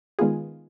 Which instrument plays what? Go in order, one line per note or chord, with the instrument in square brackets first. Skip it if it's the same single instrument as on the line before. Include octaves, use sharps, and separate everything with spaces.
[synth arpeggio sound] D#3 G#3 B3 F4 G#4